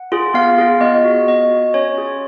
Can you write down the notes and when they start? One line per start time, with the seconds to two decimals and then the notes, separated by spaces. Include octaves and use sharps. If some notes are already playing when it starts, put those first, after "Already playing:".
Already playing: F#5
0.12 F4 G#4
0.34 B3 F5
0.58 F4 G#4
0.81 B3 D#5
1.04 F#4
1.28 B3 D#5
1.51 F#4
1.74 C#4 C#5
1.98 F4 G#4